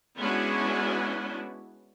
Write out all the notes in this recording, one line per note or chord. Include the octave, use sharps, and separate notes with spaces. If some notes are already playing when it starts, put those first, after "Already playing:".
G#3 B3 C#4 D4 E4 F#4